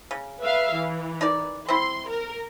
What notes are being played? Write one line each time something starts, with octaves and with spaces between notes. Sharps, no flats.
C#3
B4 E5 F5
E3
D#4 A#4 D5
C4 E4 C6
A#4